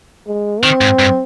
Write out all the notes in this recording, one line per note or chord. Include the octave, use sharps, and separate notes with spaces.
G#3
D#3 C4
G#2
G2